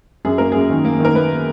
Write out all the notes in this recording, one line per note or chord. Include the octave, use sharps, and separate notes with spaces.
F#2 G#4
A#3 A#4
F#2 G#4
D#3
A#3
D#3 A#4
A#3 B4